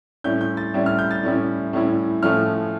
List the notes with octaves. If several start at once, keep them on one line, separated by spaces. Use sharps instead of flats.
A2 G3 C#4 E4 G6
G6
A6
A2 G3 C#4 E4
F6
G6
A6
A2 G3 C#4 E4
A2 G3 C#4 E4
A2 F3 A3 C#4 F6